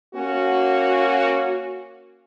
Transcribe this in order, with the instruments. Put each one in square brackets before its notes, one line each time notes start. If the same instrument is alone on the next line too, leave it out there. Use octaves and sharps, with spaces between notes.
[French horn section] A#3 C#4 F#4